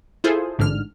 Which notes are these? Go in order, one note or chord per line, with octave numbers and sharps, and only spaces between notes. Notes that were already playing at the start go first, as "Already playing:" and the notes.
E4 F4 G#4 A4 C5
A1 G#2 D3 F6